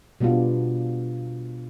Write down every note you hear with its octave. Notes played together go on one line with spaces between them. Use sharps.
B2 G3 B3 D4 F4